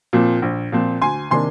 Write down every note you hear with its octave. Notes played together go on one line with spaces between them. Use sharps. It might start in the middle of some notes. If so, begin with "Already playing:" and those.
A#2 F3 C4
A#1
A#2 F3 C4
D2 G#5 C6
C3 D#3 A#3 D4 G#5 C6